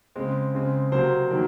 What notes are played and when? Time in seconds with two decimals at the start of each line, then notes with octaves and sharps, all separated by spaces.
0.16 C#3 G#3 C4
0.54 C#3 G#3 C4
0.92 C3 F#3 A#3 C5
1.31 D#3 F#3 A#3